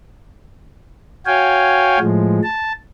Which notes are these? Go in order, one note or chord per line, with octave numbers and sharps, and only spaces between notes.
F#4 C#5 F5 G5 G#5
A2 F3 G#3
A5